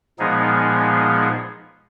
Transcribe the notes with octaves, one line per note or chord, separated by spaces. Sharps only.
A#2 F3 G#3 B3 D#4 G#4